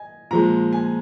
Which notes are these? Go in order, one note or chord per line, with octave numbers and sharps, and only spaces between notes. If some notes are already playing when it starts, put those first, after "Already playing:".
Already playing: D#5 G#5
A#2 F3 G#3 A#5
G#5